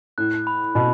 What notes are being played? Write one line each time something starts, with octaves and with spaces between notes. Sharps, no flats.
A2 F#6
B5
B2 B5